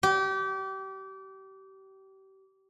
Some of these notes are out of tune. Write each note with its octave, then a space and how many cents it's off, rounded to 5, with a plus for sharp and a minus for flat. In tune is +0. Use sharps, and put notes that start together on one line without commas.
G4 -30